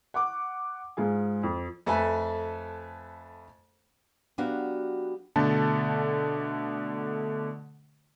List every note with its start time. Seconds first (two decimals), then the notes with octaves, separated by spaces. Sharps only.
0.14 F#5 C#6 D6
0.97 G#2 F4 G#4
1.43 F2
1.86 F2 A3 A4 B4 E5 G#5
4.38 F#3 B3 D4 F#4 G4 F5
5.36 B2 D3 A3 A5